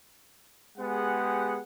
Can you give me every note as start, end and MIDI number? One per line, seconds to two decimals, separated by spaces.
0.78 1.61 56
0.78 1.61 59
0.78 1.61 67
0.78 1.61 68
0.78 1.61 78